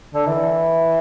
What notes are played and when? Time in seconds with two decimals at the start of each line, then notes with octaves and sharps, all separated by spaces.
0.14 D3
0.27 E3